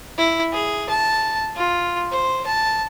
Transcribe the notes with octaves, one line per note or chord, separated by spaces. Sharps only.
E4
G#4
A5
F4
C5
A5